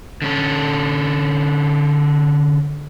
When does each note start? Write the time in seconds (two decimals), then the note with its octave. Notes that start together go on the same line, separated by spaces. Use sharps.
0.22 D3 C#4 A4